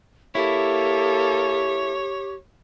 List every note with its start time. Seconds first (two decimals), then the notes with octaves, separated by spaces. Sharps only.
0.35 A#3 E4 G4 A4 C#5